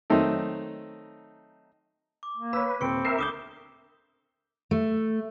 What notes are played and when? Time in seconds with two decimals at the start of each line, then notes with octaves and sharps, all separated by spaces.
0.10 D#3 F#3 A3 C4 D#4
2.23 D6
2.37 A#3
2.53 B4 C#5 B5 E6
2.81 D#1 C4 C#6 C#7 D7
3.05 A#4 E5 C7
3.19 D2 D6 D#6 G6 G7
4.71 A3